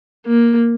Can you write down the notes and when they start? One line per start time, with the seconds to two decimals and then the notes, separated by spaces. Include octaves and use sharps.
0.26 A#3